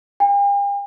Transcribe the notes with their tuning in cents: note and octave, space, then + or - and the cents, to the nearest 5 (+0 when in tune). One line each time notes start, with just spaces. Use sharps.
G5 +45